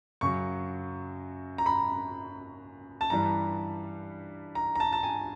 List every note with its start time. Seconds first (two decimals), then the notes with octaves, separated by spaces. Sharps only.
0.21 F#2 C#3 F#3 C#6
1.58 A#5
1.66 B5
3.01 A5
3.10 G2 E3 G3 A#5
4.55 A#5
4.75 A#5
4.80 A5
4.93 A5
5.03 G#5